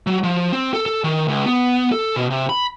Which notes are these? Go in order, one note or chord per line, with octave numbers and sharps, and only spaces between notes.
F#3
F3
C4
A4
A4
D#3
C#2
B3
A4
B2
C3
B5